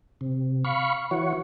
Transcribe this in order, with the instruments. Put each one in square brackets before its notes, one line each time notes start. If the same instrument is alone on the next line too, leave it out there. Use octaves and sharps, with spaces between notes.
[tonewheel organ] C3
F5 B5 C#6
E3 F#4 C#5